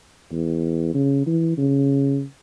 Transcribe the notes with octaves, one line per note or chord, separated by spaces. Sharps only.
E2
C#3
E3
C#3